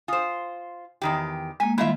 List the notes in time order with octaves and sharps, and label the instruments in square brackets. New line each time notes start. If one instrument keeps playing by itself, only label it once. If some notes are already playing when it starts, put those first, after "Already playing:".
[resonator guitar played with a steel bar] F4 C5 [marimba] G#5 D#6
[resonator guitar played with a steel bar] E2 D#3 G4
[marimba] G#3 A#3 [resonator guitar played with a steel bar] G#5
[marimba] D#3 G3 [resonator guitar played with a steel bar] E4 F4 E5